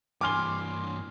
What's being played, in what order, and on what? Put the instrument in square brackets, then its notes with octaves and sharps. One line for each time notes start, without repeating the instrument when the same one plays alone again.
[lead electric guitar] G2 E3 [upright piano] G#5 F6 G7 [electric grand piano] C6 D6